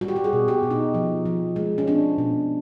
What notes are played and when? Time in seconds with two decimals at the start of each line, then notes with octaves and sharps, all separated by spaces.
0.01 G3 F#4
0.08 G4
0.16 F#4
0.24 G#4
0.33 B2
0.48 G4
0.63 B2
0.71 D#4
0.94 F3
1.26 F3
1.56 G#3
1.78 C#4
1.87 C4 D4
2.18 B2